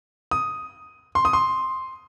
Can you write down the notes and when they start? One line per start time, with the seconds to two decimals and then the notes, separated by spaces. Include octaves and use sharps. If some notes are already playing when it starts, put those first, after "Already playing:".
0.31 D#6
1.15 C6
1.25 D#6
1.33 C6